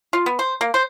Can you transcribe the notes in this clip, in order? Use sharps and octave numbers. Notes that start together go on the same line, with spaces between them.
F4
B3
C5
A#3
C5